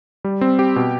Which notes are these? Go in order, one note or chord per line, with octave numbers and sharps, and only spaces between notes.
G3
C4
G4
B2